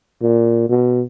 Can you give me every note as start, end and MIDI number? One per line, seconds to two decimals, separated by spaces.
0.22 0.67 46
0.69 1.03 47